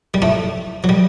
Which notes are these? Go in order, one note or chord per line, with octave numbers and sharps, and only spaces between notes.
G3
A2 A3
F#3
G3